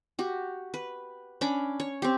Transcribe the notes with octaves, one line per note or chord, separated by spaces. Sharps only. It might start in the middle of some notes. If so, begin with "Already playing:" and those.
F#4 G4
B4
C#4 D4 B5 D6
C#5
C4 G4